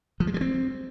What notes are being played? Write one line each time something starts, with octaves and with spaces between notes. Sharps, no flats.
F3
G#3
G3
C4